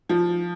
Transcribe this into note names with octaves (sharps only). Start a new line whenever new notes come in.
F3